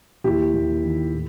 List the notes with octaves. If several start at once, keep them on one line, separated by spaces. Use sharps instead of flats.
D#2 E4 G4
D#2
D#3
A2